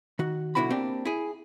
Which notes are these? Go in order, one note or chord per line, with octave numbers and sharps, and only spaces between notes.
D#3 F#4
B1 D3 E4 F#4 B5
A#3 C4 D4 G4
E4 G#4